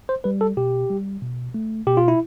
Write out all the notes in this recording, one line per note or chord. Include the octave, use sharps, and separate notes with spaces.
C5
G3 B4
A4
B2 G4
G3
B2
A3
B2 G4
F4
E4